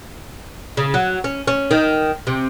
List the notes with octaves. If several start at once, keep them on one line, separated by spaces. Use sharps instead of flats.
C#3
F#3
C#4
C#4
D#3
C3